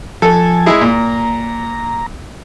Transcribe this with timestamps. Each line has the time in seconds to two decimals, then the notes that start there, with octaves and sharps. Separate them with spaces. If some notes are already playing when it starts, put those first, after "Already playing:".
0.22 F3 A4 G#5 A5
0.66 G#3 E4 G#4
0.81 A#2 A#5